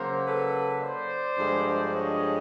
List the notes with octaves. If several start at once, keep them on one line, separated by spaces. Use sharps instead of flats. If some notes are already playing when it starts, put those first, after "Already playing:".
Already playing: C#3 F#3 A#3 A#4 C5
A4 B4
C5 D5
G2 D3 F3 G#3
C#5 D#5